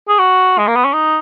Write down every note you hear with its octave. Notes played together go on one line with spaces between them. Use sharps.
G#4
F#4
G#3
A#3
B3
C#4
D#4